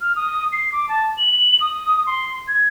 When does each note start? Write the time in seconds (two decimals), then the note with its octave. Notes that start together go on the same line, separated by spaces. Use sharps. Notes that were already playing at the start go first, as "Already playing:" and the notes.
0.01 F6
0.16 D#6
0.52 C7
0.72 D6
0.89 A5
1.17 F#7
1.61 D#6
2.07 C6
2.48 G#6